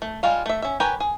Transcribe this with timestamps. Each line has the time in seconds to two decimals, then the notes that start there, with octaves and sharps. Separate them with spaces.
0.02 A3
0.23 G3 G#3 F4 F5
0.46 A3 E5
0.62 C#4 E5
0.80 G4 A#4 B4 C#5 G#5
1.00 G#4